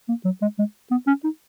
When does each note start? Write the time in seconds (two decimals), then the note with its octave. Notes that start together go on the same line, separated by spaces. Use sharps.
0.09 A#3
0.25 F#3
0.42 G#3
0.59 G#3
0.91 B3
1.07 C#4
1.24 D#4